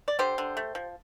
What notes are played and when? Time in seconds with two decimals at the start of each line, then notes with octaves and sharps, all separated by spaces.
0.08 D5
0.19 D3 G4 C5
0.38 D3
0.57 A3
0.75 F3